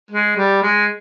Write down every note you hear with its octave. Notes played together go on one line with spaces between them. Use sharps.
G#3
G3
G#3